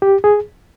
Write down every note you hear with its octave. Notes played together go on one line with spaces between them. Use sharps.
G4
G#4